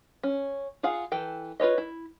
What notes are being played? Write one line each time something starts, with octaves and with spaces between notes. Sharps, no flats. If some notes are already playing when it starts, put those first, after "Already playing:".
C#4
F4 G#4 F5 F#5
E3 A4 G5
F4 B4 C#5 D#5
E4